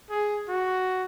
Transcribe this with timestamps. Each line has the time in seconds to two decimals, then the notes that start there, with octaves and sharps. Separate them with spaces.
0.10 G#4
0.49 F#4